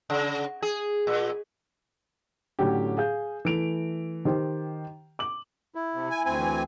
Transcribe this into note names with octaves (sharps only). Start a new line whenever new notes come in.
C#3
G#4
A#2
A2 D3 F#3 C#4 G4
G#4 F5 G6
E3 A3 D7 F7
D#3 G4 C5
D6 F#7
E4
C3
G#5
D2 C4 G#5
E3